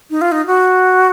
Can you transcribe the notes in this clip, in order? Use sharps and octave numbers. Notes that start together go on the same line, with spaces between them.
D#4
F4
D#4
F#4